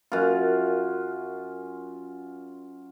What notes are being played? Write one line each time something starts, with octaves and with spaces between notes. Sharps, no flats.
F#2 F4